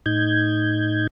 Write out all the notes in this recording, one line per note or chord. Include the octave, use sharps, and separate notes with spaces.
A2 D#4 G6 G#6